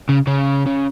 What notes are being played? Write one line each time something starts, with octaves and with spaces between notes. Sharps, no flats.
C#3
C#3
C#3